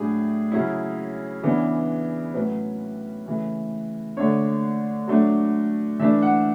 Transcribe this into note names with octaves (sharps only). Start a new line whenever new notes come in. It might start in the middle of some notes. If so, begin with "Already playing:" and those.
Already playing: A2 F#3 A3 D4 G#4
C#3 F#3 C#4 E4
C#3 E3 B3 D4
A2 F#3 C#4 B4
C#3 E3 A3
D3 A3 D4 C#5
F#3 A3 D4
E3 A3 D4 E5
F#5